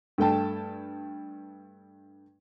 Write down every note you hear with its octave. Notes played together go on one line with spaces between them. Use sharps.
G2 A3 G5 A5